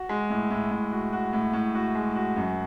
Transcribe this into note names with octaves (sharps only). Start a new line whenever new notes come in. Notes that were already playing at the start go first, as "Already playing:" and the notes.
Already playing: F#4
G#3
A2
A2
A2
F#4
F#4
A2
A2
F#4
G#3
F#4
F#2